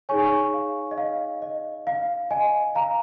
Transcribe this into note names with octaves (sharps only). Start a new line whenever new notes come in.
D#4 G#4 C#5 G#5 C#6
F5
D#5
F5
D#5
F5
D#5 G#5
F5 A#5